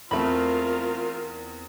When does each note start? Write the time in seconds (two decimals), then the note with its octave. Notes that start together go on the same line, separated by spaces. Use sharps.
0.11 E2 A3 C4 F4 A#4 B5